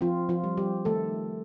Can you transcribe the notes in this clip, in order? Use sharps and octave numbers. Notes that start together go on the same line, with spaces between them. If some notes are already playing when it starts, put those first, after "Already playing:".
F3 C4 F4
F3 F4
G3
G3 G4
D#3 A3 A4